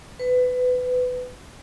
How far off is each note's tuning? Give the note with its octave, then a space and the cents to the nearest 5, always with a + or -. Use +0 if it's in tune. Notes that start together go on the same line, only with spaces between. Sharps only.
B4 +20